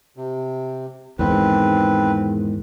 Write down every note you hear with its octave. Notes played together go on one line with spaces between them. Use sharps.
C3
E2 G#2 D#3 C4 B4